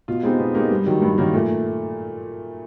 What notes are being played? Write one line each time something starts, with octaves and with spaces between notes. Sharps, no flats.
B2 F4
G#3 B3 C4 D#4 G4
B2 B3
G#3 A#3 B3 D#4 G4
G2 G3
D#3 F#3 G3
G2
D#3 F#3 A#3
A#2 A3